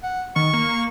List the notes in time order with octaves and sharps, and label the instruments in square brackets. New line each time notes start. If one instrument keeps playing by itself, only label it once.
[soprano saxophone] F#5
[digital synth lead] D#3 [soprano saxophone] C#6
[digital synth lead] A#3